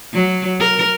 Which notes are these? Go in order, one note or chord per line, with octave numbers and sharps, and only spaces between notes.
F#3
A#4